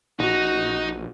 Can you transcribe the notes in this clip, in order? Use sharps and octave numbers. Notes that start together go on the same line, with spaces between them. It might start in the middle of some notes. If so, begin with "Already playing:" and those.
A#1 D#4 F#4